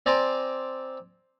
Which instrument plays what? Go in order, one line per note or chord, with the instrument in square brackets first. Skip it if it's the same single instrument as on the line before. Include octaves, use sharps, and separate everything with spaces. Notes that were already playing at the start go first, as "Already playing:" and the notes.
[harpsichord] C4 D5 G#5 A#5 C6 D6